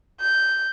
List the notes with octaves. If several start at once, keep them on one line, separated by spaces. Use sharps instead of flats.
G6